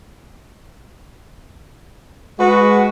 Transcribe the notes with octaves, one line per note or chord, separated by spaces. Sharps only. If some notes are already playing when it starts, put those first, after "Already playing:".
G#3 F#4 B4